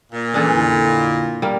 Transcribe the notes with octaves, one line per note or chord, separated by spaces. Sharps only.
A#2
E3 G3 C#4 D4 G#4 A4
F2 D3 E4
G3 A#3